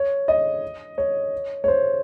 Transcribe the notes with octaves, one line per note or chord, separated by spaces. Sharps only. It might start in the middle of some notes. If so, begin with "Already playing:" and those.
Already playing: C#5
D#5
C#5
C#5
C5